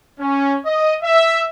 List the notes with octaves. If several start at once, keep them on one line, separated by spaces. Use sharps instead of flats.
C#4
D#5
E5